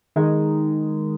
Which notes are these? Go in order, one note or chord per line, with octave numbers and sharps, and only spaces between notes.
D#3 G#3 D#4